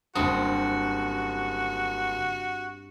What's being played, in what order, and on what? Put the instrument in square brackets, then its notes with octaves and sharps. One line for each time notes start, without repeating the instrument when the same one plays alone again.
[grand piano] F#1 D#6 [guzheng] G2 C4 C5 [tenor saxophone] F#4